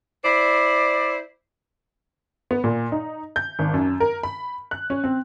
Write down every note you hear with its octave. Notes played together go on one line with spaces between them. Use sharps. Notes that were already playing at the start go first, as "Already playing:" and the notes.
E4 C5 D5
B3
A#2
D#4
G6
G#1
F#2
A#4
B5
F#6
C#4
C4